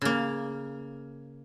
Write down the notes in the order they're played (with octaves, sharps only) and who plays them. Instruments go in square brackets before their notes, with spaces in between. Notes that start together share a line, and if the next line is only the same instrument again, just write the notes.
[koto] C#3 A#3